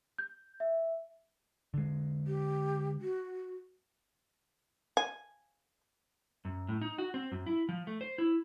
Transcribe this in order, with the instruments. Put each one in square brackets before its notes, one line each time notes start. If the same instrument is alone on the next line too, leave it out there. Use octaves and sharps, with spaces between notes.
[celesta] G6
E5
[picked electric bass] D3 G#3
[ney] G4
F#4
[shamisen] G#5
[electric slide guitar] F#2
A2
D#4
F#4
C4
F#2
E4
F3
A3
C5
E4